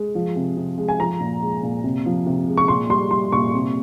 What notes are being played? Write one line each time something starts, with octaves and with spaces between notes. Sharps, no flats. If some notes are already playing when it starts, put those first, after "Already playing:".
Already playing: G#3
F3
C3
C3
G#3
G#5
F3 A#5
A#2
G#3
A#2
C3
F3
C3
G#3
C#6
A#2 C6
G3 C6
G3 C6
A#2 C#6
C3